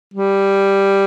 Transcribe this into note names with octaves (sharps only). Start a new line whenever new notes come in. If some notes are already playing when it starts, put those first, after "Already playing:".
G3